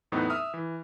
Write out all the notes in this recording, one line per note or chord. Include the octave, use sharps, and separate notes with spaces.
E2 A2 F#3 B3 C4 D#4
E5 D#6 F6
E3